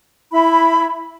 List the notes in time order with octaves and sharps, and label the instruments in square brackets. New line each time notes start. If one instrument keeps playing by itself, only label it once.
[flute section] E4 B5